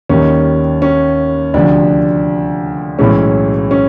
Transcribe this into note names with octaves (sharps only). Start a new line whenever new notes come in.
D#2 D#3 G3 C#4
C#4
D2 C3 F3 D4
B1 A2 E3 G#3 C#4
C#4